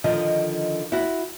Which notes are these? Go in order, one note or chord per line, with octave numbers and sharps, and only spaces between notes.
D3 D#3 F3 D#5
E4 F#4